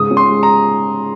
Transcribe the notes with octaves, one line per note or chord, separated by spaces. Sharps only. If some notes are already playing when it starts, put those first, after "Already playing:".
Already playing: G#2 C#3 D#6
C#4
C6
G#3
A#5